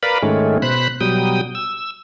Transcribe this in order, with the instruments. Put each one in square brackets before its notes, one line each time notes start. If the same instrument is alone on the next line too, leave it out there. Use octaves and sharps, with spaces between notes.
[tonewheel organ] A#4 B4 D5 F5 B5
G#2 D#3 G#3 A3 C#4
B2 C5 B5 F#6
B2 F#3 G3 G5 D#6
E6